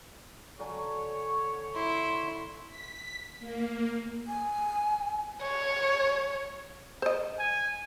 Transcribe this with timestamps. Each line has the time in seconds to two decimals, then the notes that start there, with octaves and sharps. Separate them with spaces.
0.59 D3 F#3 C#5 G#5
1.75 E4 C6
2.69 B6
3.39 A#3
4.28 G#5
5.42 C#5
7.02 C5 D#5
7.39 G#5